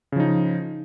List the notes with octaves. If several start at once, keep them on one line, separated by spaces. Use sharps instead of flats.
C#3 F3 D#4